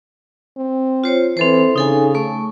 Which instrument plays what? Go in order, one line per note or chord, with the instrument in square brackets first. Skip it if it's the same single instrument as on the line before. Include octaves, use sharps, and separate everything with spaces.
[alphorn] C4
[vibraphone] F4 C5 C#5
[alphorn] E3 [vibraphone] C4 A4 C5
[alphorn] C#3 [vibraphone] D#4 A4 G#5
[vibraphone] A3 C#6